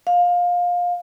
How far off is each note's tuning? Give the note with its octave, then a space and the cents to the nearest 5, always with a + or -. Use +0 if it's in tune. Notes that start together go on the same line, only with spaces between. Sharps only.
F5 +20